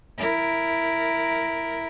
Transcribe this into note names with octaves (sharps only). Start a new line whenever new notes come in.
E4 A#4